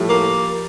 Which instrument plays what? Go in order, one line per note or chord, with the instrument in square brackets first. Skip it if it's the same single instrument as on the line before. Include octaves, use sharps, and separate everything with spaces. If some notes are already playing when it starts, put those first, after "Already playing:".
Already playing: [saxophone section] A2 [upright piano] F3 G3
[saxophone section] A#3